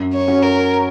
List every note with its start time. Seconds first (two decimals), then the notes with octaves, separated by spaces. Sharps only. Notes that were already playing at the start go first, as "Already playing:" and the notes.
Already playing: F#2
0.13 C#5
0.28 F#3 C#4 F#4
0.43 A#4